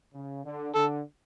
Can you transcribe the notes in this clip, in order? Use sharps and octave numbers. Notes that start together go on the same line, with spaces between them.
C#3
D3
D3 A4